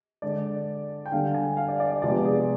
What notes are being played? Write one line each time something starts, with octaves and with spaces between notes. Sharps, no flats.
D3 G#3 D4 D5
G5
D3 G3 D4 F5
G#5
F5
D5
D5
D5
C3 F3 G#3 B3 D4 D5
G#4